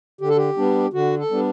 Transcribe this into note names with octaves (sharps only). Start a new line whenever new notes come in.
D3 G4
A4
G4
G3 B3 D4
D3 F#4
A4
G3 B3 D4